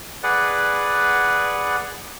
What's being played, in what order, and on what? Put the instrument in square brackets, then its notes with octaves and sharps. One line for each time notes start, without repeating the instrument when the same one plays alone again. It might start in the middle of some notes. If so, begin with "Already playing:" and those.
[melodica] G#4 B4 D5 F#5